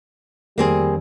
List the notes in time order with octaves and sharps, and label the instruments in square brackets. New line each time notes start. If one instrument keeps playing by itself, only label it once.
[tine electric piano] F2 D#3 [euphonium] G3 [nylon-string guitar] A#3 C4 G#4